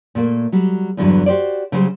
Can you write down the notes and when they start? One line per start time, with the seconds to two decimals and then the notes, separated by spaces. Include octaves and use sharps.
0.15 A#2 A3 A#3
0.52 F#3 G3
0.97 E2 G2 D3 E3 F#3
1.26 F#4 G4 B4 C5 D5
1.72 C#3 F#3 G3 G#4 C5